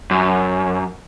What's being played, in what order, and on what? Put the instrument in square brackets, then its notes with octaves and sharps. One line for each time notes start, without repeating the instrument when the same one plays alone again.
[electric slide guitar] F#2